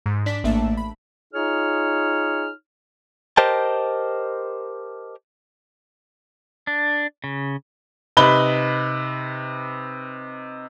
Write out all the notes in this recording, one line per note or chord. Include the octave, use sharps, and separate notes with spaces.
G#2
D4 D5 B6
A1 A3 A#3 D4 E5 A5
B5
D#4 F4 G#4 C#5 F6
G4 A#4 C5 D#5 G5 A5
D4
C#3
C3 D#4 B4 B5 G7